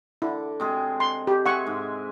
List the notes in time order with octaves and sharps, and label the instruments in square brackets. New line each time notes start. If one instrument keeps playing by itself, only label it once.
[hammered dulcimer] D3 [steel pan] E4
[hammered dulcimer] C3 G#3 G#4
[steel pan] C6
G4
[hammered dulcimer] G#3 E5 G#5 [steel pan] F#5 C#6
[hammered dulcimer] G#2